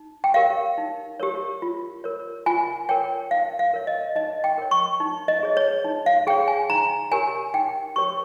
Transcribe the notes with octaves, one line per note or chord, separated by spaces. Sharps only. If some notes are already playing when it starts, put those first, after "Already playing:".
Already playing: D#4
G5
G4 A#4 C#5 F5
D#4
G4 A#4 C#5
F4
A#4 C#5
F4 G#5
A#4 C#5 G5
D#4 F5
F5
A#4 C#5
D#5
D#4 D#5
G5
A#4 C#5
C#6
D#4
D#5
G#4 C#5
C#5
D#4
F5
G#4 C#5 G5
G#5
D#4 A#5
G4 A#4 C#5 G#5
D#4 G5
G4 A#4 C#5 C#6